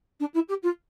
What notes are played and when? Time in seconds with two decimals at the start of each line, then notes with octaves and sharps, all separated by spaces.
0.20 D4
0.34 E4
0.48 G4
0.63 F4